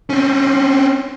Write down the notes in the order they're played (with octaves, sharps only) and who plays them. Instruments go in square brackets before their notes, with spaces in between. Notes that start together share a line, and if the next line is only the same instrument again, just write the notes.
[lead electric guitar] C4 C#4